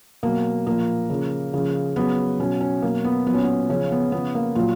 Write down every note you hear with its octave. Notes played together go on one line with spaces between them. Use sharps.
B2 F#3 A#3
A#2 F3 A#3
C#3 F3
C#3 F3
C#3 F#3 B3
B2 F#3 C#4
C#4
B2 F#3 A#3
B3
A#2 F#3 B3
C#4
B3
C#3 F3 C#4
B3
C#3 F3 B3
A#3
A#2 F#3 F4